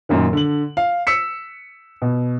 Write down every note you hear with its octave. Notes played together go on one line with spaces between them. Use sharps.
F#2 A#2 D#3
D3 F#7
F5
E6 B6 C#7
B2